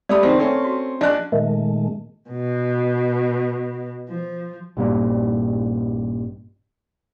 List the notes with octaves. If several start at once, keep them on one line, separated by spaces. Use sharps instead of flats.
A3 G4 D5 B5 D#6
F#1 D#3 C4 F4
A3 C4 C#4
F#4
A#1 D4 D#5 F#6
A#2 D#3 G#3 A3
B2
F3
A#1 G2 A#2